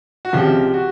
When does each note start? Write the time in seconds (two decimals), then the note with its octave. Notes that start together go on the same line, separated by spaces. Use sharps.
0.25 F#4
0.33 C#2 C3 F3 G4
0.74 F#4